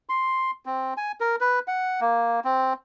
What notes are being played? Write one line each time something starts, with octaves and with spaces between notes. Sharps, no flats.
C6
C4
G#5
A#4
B4
F#5
A#3
C4